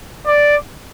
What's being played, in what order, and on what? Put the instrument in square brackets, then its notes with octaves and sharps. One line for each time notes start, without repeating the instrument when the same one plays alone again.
[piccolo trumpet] D5